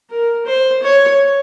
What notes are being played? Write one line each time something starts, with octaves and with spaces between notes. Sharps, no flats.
A#4
C5
C#5